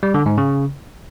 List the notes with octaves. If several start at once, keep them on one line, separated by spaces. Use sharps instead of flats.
G3
D3
G#2
C#3